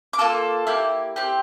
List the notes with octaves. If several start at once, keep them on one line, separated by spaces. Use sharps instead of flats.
D6
A#3 F4 A4 E6
A#3 E4 G4
C4 G4